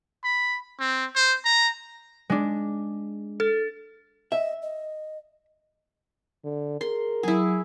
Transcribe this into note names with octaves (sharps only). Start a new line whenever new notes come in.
B5
C4
C5
A#5
G#3 D4
A4 A6
D#5 E5
D#5
D3
G#4 A#4 C6
F#3 E4 G#4 G#5